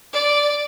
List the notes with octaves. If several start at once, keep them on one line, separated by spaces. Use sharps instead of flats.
D5